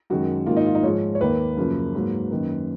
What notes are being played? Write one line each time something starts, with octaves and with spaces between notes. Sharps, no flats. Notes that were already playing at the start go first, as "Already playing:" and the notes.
F#2 D#3 G#3 F#4
G#2 D#3 A#3 F4
D#4
F4
D#4
G#2 F3 G#3 C#5
C#5
D#2 D#3 A#3 B4
F#2 C#3 F3 A#3
G#2 F#3 A#3
F#2 D#3 A#3